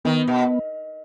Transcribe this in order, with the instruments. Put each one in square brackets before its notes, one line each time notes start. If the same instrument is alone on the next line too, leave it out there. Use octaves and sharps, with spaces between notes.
[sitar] D#3 [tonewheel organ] B3
[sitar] B2